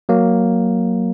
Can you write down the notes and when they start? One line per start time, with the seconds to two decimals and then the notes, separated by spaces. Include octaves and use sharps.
0.09 F#3 A#3